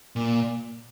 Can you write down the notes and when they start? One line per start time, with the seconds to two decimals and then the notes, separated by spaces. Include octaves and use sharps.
0.16 A#2